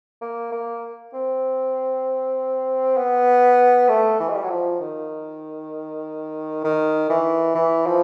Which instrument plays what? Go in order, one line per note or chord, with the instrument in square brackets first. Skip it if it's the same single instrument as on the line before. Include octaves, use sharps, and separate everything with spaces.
[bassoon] A#3
A#3
C4
B3
A3
E3
G#3
G3
F#3
F3
D#3
D#3
E3
E3
F3